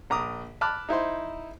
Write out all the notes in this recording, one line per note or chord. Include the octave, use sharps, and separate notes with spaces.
A#1 A#5 D6 D#6
A5 B5 D6 F6 F#6
D#4 E4 C5 C6